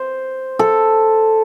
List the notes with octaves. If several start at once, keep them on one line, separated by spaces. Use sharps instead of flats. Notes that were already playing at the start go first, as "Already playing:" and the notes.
Already playing: C5
A4